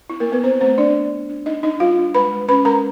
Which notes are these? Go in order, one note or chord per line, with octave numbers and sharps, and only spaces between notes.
C4 E4
A#3 A#4
C4
B3 B4
C4 C5
A3 C4 C5
D4 D5
B3
B3
D4
D4 D#4 D#5
D4 D#4 D#5
G3 F4 F5
D4
G#3 B4 B5
G#3
C#4 B4 B5
G#3 A#4 A#5